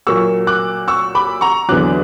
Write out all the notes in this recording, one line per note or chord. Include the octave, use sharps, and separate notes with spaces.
A#2 F#3 A#3 C#6 E6
D6 F#6
C#6 E6
B5 D6
A#5 C#6
E2 D3 F#3 D6 F#6